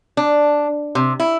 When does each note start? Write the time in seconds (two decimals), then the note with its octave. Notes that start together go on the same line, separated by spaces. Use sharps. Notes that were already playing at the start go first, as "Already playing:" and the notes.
0.17 D4
0.95 C3
1.20 E4